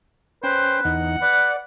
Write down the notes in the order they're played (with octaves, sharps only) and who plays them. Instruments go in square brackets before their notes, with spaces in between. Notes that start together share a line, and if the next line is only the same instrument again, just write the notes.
[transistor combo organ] C#4 G5 [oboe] B4 [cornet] C5
[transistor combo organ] E2 D#4 [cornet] F#5
[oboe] B4 [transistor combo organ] D5